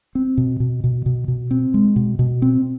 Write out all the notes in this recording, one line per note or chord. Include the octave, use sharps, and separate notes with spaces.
C4
B2
B2
B2
B2
B2
C4
G#3
B2
B2
C4